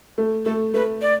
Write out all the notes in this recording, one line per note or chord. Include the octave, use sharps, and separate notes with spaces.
A3
A3 A4
A3 B4
D5